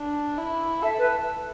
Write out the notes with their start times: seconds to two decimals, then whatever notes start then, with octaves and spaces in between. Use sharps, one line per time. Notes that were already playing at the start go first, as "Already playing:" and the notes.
Already playing: D4
0.37 E4
0.83 A4 E5
0.98 B4